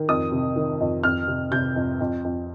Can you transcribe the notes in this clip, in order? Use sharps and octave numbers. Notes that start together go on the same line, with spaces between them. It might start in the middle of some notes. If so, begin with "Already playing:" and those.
Already playing: D#3
F2 D#6
C3
D#3
F2
F2 F6
C3
C3 G6
F2
F2
F2